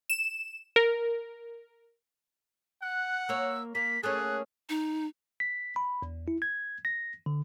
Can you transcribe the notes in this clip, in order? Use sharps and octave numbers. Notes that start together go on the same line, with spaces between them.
E7
A#4
F#5 F#6
A#3 C#5 E6
A#3 B6
A3 A#3 C#4 G#4 F#6
D#4
B6
B5
E2
E4
G#6
A#6
D3